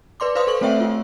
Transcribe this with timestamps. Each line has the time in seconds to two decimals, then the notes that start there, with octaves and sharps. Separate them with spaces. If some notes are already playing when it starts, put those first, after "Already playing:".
0.20 B4 D5 C6 D6
0.35 B4 C5 D5 F5 C6 D#6
0.47 A4 C#6 F#7
0.61 A3 C4 C#5 E5 G5
0.81 F4